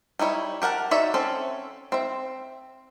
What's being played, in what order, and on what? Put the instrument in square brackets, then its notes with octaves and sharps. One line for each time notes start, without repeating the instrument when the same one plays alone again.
[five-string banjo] G3 D#4 E4 C#5
G4 A#4 F#5 A5
D#4 F#4 C#5 D5 E5
C4 C#4 A4
C4 E5